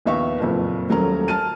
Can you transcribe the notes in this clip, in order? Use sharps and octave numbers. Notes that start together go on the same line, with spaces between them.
A#1 D#2 B3 E5 F5 C#6
F#1 F2 A#2
D#1 F#3 A3 C#4 A#4 A#5
A5 F6 D#7